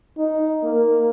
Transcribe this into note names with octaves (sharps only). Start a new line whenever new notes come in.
D#4
A#3